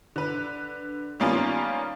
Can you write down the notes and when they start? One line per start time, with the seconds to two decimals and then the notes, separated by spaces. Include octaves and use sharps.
0.16 D3 B4
1.20 D#3 G3 A#3 B3 C#4 F4